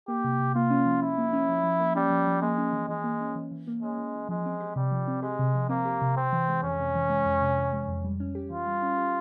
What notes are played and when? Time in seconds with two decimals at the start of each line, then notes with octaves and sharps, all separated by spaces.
0.08 A#3 G4
0.24 C3
0.40 C3
0.55 A#3 F4
0.70 C#4
0.86 F3
1.02 F3 E4
1.18 A#3
1.33 C#4
1.49 F3
1.64 F3
1.80 A#3
1.95 G3 C#4
2.10 F3
2.27 F3
2.42 G#3 A#3
2.58 C#4
2.73 E3
2.88 E3 G#3
3.04 A#3
3.21 C#4
3.35 E3
3.51 E3
3.67 A#3
3.82 G#3 C#4
3.98 E3
4.14 E3
4.29 F3 G#3
4.46 C4
4.60 G4
4.76 C3 G3
4.92 F3
5.08 C4
5.22 G#3 G4
5.39 C3
5.54 F3
5.69 A#3 C4
5.85 G4
6.02 C3
6.17 C3 C4
6.33 E3
6.48 G#3
6.63 F2 C#4
6.78 C3
6.95 E3
7.10 G#3
7.25 F2
7.41 C3
7.57 E3
7.73 G#3
7.88 F2
8.04 G3
8.20 C#4
8.35 G4
8.50 E3 F4
8.67 G3
8.82 C#4
8.98 G4